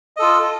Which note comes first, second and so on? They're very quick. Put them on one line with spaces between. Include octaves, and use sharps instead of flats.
D#5 A4 F4